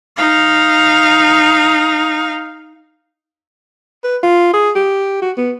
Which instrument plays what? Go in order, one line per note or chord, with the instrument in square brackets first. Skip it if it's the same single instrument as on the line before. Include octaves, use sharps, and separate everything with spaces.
[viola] D#4 F5
[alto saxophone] B4
F4
G#4
G4
F#4
B3